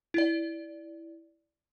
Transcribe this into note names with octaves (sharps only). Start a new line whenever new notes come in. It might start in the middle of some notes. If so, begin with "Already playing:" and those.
E4 D5